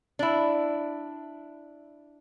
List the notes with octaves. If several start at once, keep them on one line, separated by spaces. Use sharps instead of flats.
D4 E4